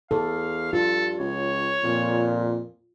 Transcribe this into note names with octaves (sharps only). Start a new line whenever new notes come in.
E2 A4 F5
G2 F4 A4
C#2 C#5
F2 A#2